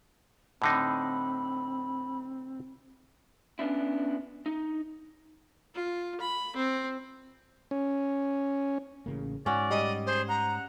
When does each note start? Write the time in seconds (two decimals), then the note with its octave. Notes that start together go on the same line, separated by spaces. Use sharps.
0.62 A2 D3 C4 D#4 B5
3.59 B3 C#4 D4 E4
4.46 D#4
5.75 F4
6.21 B5
6.56 C4
7.71 C#4
9.06 A1 C#3 A#3
9.46 G#2 C#4 F#4 D5
9.71 G3 D#5
10.07 G#4 C5
10.29 F#5 A#5